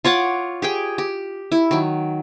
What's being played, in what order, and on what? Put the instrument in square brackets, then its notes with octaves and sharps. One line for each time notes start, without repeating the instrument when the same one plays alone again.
[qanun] F4 C#5 F#5 D6
G4 G#4 G5
G4
E4
D#3 F#3